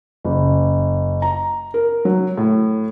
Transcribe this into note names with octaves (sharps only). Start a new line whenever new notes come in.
F#1
A#5
A#4
F#3
A2